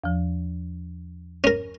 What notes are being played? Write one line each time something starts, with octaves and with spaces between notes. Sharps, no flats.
E2 F3
C#4 A#4